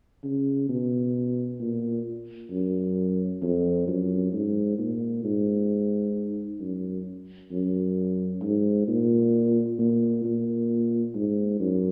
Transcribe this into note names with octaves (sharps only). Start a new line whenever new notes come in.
C#3
B2
A#2
F#2
F2
F#2
G#2
A#2
G#2
F#2
F#2
G#2
A#2
A#2
A#2
G#2
F#2